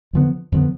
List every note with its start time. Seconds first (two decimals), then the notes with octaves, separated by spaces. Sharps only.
0.13 F2 D3 F3 B3
0.52 F2 D3 F3 B3